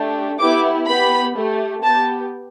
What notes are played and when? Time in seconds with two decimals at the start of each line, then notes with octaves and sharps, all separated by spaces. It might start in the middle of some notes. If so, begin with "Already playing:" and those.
Already playing: A3 D4 G4
0.39 B3 E4 G4 D6
0.87 B3 G4 B5
1.36 A3 G4
1.83 B3 G4 A5